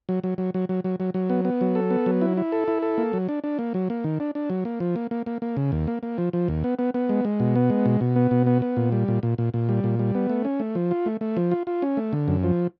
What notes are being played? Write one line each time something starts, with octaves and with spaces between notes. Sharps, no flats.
F#3
F#3
F#3
F#3
F#3
F#3
F#3
F#3
B3
B3
F#3
A4
B3
F#3
E4
E4
A4
E4
A4
A#3
F#3
D4
D4
A#3
F#3
A#3
D#3
D4
D4
F#3
A#3
F3
A#3
A#3
A#3
A#3
C#3
D#2
A#3
A#3
F3
F3
D#2
B3
B3
B3
G#3
G#3
B2
B3
G#3
B2
B2
B3
B2
B3
B3
A#2
G3
A#2
A#2
A#2
A#2
G3
A#2
G3
B3
A3
C#4
A3
F3
F4
A3
A3
F3
F4
F4
C#4
A3
D3
F#2
F3